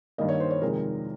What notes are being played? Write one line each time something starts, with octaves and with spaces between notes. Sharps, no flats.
G2 D#3 A#3 D#5
C#5
C5
C#5
F2 C3 D#3 G#3 A#4